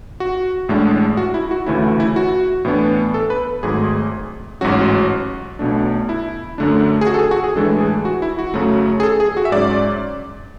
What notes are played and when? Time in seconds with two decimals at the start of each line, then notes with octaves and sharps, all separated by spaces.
0.20 F#4
0.69 A1 A2 G#3 D4
1.17 F#4
1.34 E4
1.51 F#4
1.66 D2 C#3 E3 A3 C#4 E4
1.83 F#4
2.00 E4
2.16 F#4
2.65 A2 E3 B3 D4
3.14 A4
3.30 B4
3.63 G#1 G#2 F#3 A3 G#4
4.61 A1 G#2 F#3 C#4 F#4
5.59 B1 B2 A3 D4
6.09 E4
6.58 F#2 D3 A3 D4
7.01 G#4
7.06 F#4
7.14 A4
7.19 G#4
7.31 F#4
7.44 G#4
7.56 A2 E3 G#3 D4 A4
7.80 G#4
8.05 F#4
8.22 E4
8.39 F#4
8.54 F#2 C#3 F#3 A3
9.00 G#4
9.03 A4
9.20 G#4
9.37 F#4
9.45 E5
9.52 G#2 F#3 C#4 D5